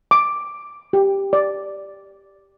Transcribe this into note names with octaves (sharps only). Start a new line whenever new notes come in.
D6
G4
D5